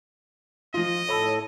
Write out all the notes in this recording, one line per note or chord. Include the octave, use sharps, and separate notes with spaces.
F3 F4 D#5
A2 A4 C#5 B5 E6